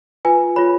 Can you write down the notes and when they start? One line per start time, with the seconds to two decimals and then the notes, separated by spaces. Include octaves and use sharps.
0.25 F4 B4 G#5
0.56 F4 G#4 C#5 B5